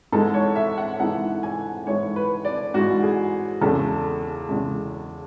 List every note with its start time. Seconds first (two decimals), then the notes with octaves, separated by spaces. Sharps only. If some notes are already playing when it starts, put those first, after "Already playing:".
0.12 G#2 E3 G#3 A4
0.34 C#5
0.56 E5
0.78 F#5
1.00 G#2 E3 G#3 F#5
1.43 G#5
1.87 G#2 E3 G#3 C#5
2.16 B4
2.45 D5
2.74 G#2 E3 G#3 F#4
3.03 G#4
3.61 E2 C#3 G#3 A4
4.49 E2 C#3 G#3